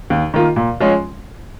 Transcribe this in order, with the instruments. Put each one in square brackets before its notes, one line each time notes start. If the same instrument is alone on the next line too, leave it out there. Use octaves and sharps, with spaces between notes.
[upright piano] D#2
D#3 A#3 F4
A#2
F3 G#3 C#4 F4